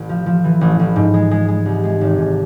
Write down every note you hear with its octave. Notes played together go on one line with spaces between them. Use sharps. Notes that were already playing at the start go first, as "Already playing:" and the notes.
Already playing: A1
F3
F3
E3
A1
A1
G#2
G#3
G#3
G#3
C2
G#3
G#1
G#2